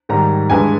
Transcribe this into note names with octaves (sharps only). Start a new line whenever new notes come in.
G#2 D#3 G3 A#5
G2 E3 G#3 G#5